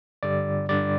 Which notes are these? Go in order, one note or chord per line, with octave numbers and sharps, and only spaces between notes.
G2 D3 G3 D5
G2 D3 G3 D5